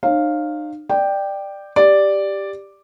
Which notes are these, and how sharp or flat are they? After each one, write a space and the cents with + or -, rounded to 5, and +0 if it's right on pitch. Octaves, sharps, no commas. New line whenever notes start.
D#4 -40 C#5 -40 F5 +0
D5 +15 G5 +0
G4 +5 D5 +0